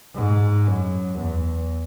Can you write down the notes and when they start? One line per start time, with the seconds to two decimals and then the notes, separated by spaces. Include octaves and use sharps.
0.15 G#2
0.67 F#2
1.18 E2